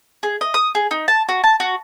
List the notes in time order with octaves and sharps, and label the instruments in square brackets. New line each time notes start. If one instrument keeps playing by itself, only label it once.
[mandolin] G#4
D#5
D#6
G#4
D#4
A5
F#4
A5
F#4